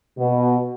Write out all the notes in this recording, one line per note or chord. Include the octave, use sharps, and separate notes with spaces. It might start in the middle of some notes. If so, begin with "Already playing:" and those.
B2